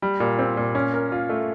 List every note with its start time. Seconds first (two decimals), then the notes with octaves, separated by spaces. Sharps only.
0.02 G3
0.20 A#2
0.39 C4
0.57 A#2
0.75 C#4
0.94 A#4
1.12 F4
1.29 A3